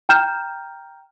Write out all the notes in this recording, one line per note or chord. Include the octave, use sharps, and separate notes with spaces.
G5 A#5 F6 G6 E7